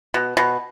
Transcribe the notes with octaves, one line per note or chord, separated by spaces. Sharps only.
B2
B2